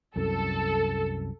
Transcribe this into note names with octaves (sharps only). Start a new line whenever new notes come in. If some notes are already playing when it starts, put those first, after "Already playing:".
C2 F#2 A4